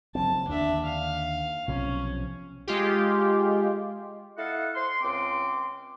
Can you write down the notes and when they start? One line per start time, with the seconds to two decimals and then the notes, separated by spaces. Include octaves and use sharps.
0.15 F#1 F#3 C4 A5
0.48 D#2 D3 D4 E5
0.85 F5
1.68 B1 C3 F3 C#4
2.67 G#3 F4 G4
4.36 E4 A4 D#5 F5 F#5
4.74 C6
5.01 C#2 C4 C6 D6